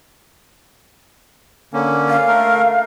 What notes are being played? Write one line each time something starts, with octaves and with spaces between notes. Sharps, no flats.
D3 A#3 C#4
F5
A3 A#4